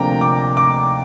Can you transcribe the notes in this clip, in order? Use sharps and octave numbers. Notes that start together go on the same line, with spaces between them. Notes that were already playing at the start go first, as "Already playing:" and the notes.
Already playing: D2 C3 F3 A#3 D4 G5 A#5
D6
D6